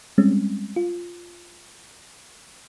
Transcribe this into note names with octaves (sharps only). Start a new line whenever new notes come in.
G3 G#3 C4 C#4
F4